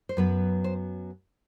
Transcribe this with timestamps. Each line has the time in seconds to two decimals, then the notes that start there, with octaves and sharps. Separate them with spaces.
0.09 C5
0.17 F#2 F#3 B3 B4
0.64 C5